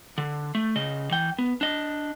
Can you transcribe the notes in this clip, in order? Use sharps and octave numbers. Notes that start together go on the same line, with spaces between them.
D3
A3
C#3 D#5
E3 G5
B3
D4 D#5